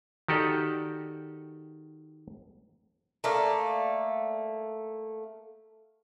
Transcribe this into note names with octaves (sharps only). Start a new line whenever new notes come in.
D#3 F#4 G4 A4 D5 D#5
A3 A#3 D5